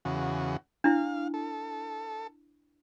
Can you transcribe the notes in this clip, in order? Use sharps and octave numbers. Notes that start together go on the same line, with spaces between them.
E2 C#3 F#4
D4 E4 F5
A4